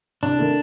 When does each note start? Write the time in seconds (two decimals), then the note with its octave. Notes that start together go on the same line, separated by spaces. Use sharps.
0.23 C2 D4
0.39 C3 D#3 A3